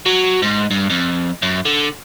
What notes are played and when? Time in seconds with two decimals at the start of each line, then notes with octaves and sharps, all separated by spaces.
0.06 F#3
0.42 G#2
0.71 G2
0.90 F2
1.42 F#2
1.65 D3